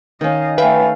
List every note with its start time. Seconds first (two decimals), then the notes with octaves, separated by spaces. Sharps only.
0.21 D#3 C#4 D#5 F5
0.58 A3 B4 E5 F5 G5 G#5 B5